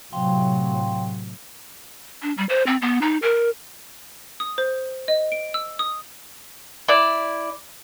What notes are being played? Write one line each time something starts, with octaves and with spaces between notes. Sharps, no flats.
A2 C3 F#3 F5 G5 C6
D4
G3
C5
C4
B3
D#4
A#4
D#6
C5
D#5
D7
E6
D#6
E4 D5